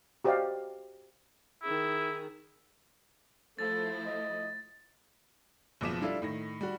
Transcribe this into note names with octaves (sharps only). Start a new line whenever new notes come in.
F#4 G4 C5 D5 D#5 F5
D#3 E4 G#4
F3 A3 E4 A4 A6
D#5
F#1 B2 F3 D6 B6 E7
G3 D4 E4 F4 A4
A2 D#3 A#6
G3 F#4